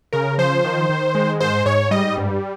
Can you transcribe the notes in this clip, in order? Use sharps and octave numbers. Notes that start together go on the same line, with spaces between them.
C#3 A#4
F3 C5
D#3
D#3
G#3
G#2 C5
G#2 C#5
G3 D#5
G2